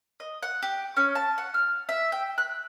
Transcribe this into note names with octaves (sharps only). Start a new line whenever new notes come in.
D#5
F#5
G4
C#4
A5
F#5
F6
E5
G5
F#6